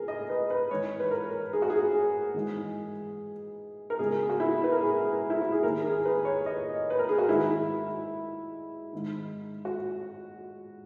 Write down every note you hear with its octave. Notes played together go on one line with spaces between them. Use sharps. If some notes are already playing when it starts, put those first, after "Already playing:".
Already playing: C#3 G#4 A#4
D#5
B4
B4
G#2 E3 C#5
B4
A#4
G#4
F#4
G#4
G#2 E3
A#4
C#2 B2 G#4
F#4
E4
B4
A#4
G#4
E4
F#4
G#4
D#2 D#3 A#4
G#4
B4
C#5
D#5
B4
A#4
G#4
F#4
G#2 D#3 E4
G#2 D#3
F#4